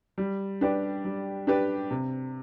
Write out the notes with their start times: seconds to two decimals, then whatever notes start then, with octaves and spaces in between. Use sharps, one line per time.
0.18 G3
0.61 D4 G4 B4 D5
1.05 G3
1.47 D4 G4 B4 D5
1.91 C3